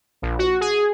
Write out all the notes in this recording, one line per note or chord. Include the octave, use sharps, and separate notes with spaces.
A#1
F#4
G#4